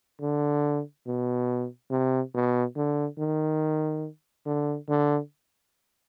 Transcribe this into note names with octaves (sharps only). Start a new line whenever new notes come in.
D3
B2
C3
B2
D3
D#3
D3
D3